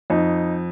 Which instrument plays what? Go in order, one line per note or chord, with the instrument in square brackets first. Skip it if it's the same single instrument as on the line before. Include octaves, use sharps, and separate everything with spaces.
[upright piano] F2 D#4